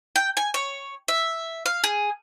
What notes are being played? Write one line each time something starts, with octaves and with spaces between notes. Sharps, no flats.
G5
G#5
C#5
E5
F5
G#4